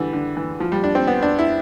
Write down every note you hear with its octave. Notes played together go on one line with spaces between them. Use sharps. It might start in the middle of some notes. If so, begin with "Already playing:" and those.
Already playing: D3 E3 G3
D3
E3
F3
G3
D4
C4
B3
D4
E4